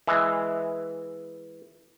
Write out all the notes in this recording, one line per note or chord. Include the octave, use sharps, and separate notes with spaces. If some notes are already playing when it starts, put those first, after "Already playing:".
E3 G#3